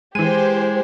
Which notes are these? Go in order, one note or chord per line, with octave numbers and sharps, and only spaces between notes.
E3 G#3 G4 C5 D#7